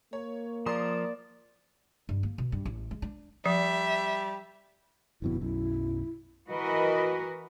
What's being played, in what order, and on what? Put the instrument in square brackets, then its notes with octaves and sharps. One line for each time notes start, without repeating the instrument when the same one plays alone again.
[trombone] A#3 [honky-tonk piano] C#5
[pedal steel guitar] F3 [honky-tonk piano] A#4 C6 D#6 [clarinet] D5
[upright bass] G2
A#3
B2
G2
A1
G#3
D4
[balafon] F3 [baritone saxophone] G3 [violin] E5
[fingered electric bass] G1 F2 B2 [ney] E4
[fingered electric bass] B1 F#2 [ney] E4
[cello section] E3 F#4 A#4 B4 D#5